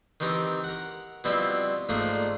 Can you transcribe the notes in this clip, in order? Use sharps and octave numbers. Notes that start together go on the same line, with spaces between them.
D#3 E3 C4 G4 A#4
A#4 F#5
B2 F3 G3 C4 E4 G4
G#2 F3 A3 A#3 D4